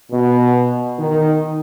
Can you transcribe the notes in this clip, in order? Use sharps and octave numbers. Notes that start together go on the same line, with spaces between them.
B2
D#3